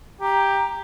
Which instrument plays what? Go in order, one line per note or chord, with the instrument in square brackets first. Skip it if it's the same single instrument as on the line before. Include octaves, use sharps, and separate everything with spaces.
[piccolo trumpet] G4 [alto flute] A#5